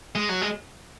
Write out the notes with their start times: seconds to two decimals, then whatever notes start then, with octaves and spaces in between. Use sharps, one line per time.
0.15 G#3
0.29 F#3
0.41 G#3